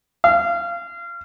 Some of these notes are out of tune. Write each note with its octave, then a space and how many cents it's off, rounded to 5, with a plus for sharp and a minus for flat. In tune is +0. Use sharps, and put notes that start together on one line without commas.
F5 -25